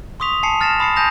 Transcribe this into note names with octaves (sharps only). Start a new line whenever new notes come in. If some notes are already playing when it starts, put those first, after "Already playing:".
C6 C#6 D#6 B6 F7
G#5 A5 C7 C#7
F6 A6 A#6 C7 E7
B5 D#6 C7 C#7
G#5 A5 D#6 G6 A#6 F7